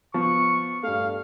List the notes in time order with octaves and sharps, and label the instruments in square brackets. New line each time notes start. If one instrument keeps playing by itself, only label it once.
[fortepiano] F3 B3 [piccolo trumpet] C#6
[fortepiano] G2 A3 [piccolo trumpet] F5